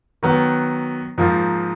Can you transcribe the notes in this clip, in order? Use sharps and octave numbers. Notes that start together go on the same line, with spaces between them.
D#3 F#3 B3
G#2 F3 A#3